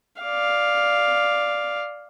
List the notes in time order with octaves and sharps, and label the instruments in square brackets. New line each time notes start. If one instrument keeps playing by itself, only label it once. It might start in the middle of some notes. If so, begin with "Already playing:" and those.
[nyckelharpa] D5 F5